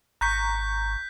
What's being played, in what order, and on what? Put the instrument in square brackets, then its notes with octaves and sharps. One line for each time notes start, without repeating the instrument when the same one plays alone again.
[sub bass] G#1 [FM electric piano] A#5 C#6 [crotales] F#6 G6 B6